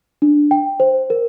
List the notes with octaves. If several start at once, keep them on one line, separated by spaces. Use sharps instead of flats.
D4
G5
C5
A#4